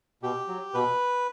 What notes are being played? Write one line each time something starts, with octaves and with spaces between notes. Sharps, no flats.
B2 G4
F#3
B2 B4